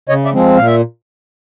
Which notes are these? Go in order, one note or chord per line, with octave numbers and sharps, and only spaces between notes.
C#3 C#5 D#5
D5 E5
F3 G#3 C4
A#2 F5
E5